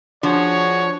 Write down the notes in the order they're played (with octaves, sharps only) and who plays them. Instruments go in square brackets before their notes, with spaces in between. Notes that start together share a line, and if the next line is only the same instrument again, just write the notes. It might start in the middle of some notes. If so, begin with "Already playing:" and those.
[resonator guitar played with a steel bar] F3 [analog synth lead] D4 [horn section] F#4 G#4 [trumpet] C#5